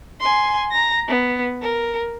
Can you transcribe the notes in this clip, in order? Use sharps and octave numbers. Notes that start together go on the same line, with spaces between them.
G#5 C6
A#5 A#6
B3
A#4